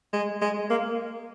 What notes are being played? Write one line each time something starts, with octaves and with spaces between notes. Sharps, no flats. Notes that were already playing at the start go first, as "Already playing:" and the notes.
G#3
G#3
A#3